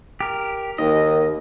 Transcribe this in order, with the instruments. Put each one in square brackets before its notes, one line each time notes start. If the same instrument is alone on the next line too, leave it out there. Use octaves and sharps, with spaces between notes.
[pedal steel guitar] G4 A#4
[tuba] D#2 [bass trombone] D#3 [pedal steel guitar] D#5